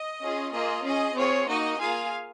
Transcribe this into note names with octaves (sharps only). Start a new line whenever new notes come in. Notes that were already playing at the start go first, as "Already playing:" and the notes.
Already playing: D#5
C#4 F4 G#4
A#3 F4 G#4 D#5
C#4 G#4 D#5
C4 F4 G#4 C#5
A#3 D#4 F#4 D#5
A#3 F4 G#4 F5 G#5